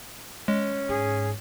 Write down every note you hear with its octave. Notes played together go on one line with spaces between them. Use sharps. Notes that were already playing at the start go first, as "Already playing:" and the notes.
G#3 C#4
G#2 G#4